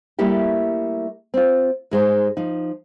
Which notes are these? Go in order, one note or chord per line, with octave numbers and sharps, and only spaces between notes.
G3 A3 A#3 E4 G4
C4 F4
G#2 G#3 C5
F3 D#4